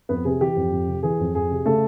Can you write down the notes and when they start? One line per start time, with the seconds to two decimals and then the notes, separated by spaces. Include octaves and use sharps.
0.09 F2 B3 B4
0.25 C3 G#4
0.41 E3 G4
0.56 F2
0.72 F2
0.87 C3
1.03 E3 G#4
1.19 F2
1.34 F2 G#4
1.51 C3
1.65 C#3 A3 A4